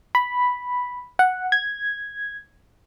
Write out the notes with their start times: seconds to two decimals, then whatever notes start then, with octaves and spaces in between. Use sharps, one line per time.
0.15 B5
1.19 F#5
1.52 G#6